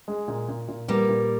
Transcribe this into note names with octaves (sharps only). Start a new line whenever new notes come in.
G#3
A#2
A#2
A#2
G3 A#3 B3
A#2